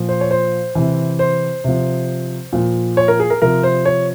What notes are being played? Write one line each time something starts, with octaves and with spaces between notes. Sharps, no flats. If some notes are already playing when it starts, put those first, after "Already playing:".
Already playing: A#2 F3
C5
C#5
C5
C3 E3
C5
C3 F3
A#2 F3
C#5
A#4
G#4
A#4
C3 F3 A#4
C5
C#5